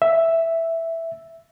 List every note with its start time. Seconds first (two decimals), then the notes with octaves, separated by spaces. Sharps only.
0.02 E5